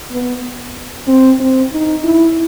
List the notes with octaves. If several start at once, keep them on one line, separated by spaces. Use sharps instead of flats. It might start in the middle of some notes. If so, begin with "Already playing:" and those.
B3
C4
C4
D#4
E4